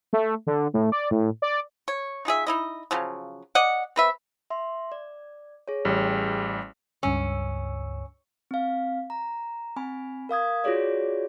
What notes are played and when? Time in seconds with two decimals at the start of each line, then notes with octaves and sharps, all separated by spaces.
0.13 A3
0.47 D3
0.74 A2
0.92 D5
1.11 A2
1.42 D5
1.88 C#5
2.25 D#4 F4 G#4 E5
2.47 D#4 E4 D#5
2.91 C#3 F3 F#3
3.55 D5 D#5 F#5
3.96 C4 B4 E5
4.50 E5 C6
4.92 D5
5.68 G#4 C#5
5.85 A1 G3 G#4 G5
7.03 C#2 G2 C#4 E6
8.51 C4 F5
9.10 A#5
9.76 C4 G#5 B5
10.29 A#4 F5 D#6 G#6
10.64 F4 F#4 G#4 C#5 D5